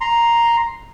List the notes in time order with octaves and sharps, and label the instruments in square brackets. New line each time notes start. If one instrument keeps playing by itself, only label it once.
[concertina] A#5 C6